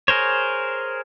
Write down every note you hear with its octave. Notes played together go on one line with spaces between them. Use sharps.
G#4 A#4 C5 C#5